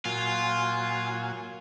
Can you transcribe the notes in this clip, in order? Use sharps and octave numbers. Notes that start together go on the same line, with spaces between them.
A#2 F#3 F4 G#5